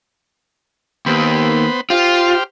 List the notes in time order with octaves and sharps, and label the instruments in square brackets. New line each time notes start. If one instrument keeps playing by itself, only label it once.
[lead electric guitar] D#2 [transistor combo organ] B3 C5 B5
[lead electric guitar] F4 [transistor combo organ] G4 C5 F6